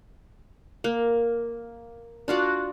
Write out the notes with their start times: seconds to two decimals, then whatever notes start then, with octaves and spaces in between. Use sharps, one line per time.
0.84 A#3
2.28 D4 F4 F#4 D5